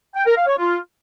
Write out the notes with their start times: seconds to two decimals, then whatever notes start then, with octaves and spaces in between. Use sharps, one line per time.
0.15 G5
0.25 A#4
0.36 F5
0.46 C#5
0.57 F4